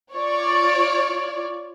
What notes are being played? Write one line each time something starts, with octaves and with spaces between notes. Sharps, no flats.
F4 C#5 D5